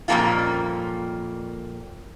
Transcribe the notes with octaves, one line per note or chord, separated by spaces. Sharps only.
F2 A#2 G3 A#3 C#4 F4